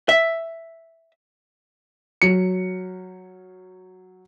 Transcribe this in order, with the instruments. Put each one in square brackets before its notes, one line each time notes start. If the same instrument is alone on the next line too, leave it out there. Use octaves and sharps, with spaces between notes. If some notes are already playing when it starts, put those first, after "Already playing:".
[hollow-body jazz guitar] E5
[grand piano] F#3 C#7